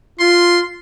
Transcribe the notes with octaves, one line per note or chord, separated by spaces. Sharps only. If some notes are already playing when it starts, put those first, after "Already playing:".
F4 C6